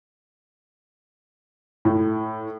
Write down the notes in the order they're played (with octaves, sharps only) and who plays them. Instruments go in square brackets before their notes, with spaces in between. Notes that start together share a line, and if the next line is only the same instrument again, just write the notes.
[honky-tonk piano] A2